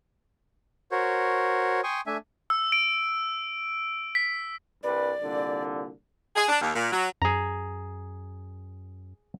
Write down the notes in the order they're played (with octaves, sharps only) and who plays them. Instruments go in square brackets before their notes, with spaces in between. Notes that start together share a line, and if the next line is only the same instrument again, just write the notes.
[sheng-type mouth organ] F#4 A#4 C5 C#5
G5 G#5 C6 C#6 D#6
A3 D4 E5 G#5
[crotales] E6
D7
B6
[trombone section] C2 G2 B4 [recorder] D5
[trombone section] C2 A#2 D3
[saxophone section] G#4
D4
D#2
A#2
F#3
[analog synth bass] F#2 [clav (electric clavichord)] G#4 A#5